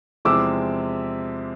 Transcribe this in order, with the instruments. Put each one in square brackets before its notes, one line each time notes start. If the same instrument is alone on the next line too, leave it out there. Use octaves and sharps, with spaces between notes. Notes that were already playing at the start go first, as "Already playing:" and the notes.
[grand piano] E2 C3 F3 G#3 [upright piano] D6 E6